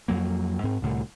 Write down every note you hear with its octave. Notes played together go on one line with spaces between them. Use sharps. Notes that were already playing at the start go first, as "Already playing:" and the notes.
F2 F#3 A#3
G#2 C4
C2 A2 D3